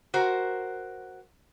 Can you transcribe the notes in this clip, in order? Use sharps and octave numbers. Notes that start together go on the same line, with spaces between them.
F#4 A#4 C5